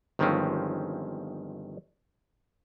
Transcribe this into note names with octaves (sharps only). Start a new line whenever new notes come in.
G1 D#3 F3 G#3 C4 C#4